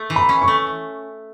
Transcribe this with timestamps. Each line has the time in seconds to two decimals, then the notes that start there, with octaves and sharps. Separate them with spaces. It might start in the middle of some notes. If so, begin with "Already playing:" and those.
Already playing: A3
0.10 E3
0.16 B5
0.29 C#4
0.42 C#6
0.48 A3